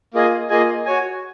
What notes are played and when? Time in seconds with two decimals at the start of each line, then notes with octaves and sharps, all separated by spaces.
0.14 A#3 F4 G#4 D#5 G#5
0.49 A#3 F4 G#4 D#5 G#5
0.86 F#4 C#5 G#5